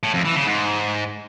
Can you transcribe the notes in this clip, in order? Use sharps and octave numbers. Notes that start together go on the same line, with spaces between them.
A2
F2
E3
C#3
G#2